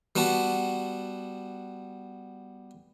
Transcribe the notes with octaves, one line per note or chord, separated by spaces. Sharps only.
G3 B3 F#4 A5